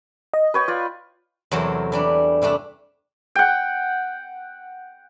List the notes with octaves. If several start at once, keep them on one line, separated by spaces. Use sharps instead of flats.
D#5
B4 C#5 G5
F4 D5
E2 C3 F#3 A3 A#4 C5
E3 G3 D4
C3 G3 A3 D4
F#5 G5